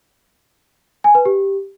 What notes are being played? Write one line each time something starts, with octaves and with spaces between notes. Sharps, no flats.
G#5
B4
G4